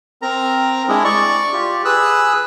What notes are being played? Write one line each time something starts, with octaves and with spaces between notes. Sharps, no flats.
C4 A#4 A#5
G#3 D4 E4 G#4
D5 C#6
F4 G4
G#4 B4 E6 F#6